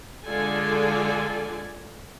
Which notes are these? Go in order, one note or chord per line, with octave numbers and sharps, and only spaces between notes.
D3 G#3 F4 A4 D5 G#5